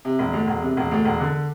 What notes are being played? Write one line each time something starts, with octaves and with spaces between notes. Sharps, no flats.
C3
E1
D2
E1
C3
E1
D2
E1
D3